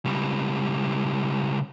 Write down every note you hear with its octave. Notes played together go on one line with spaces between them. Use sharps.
C#2 G3